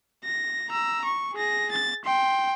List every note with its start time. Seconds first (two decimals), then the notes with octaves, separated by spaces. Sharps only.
0.24 A#6
0.69 A#5 E6
1.05 C#6
1.34 G#4 A#6
1.72 A6
2.05 G5 C6